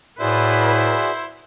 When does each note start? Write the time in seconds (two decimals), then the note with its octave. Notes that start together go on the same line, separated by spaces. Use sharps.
0.20 A2 E4 F#4 G#4 B4 C5 D5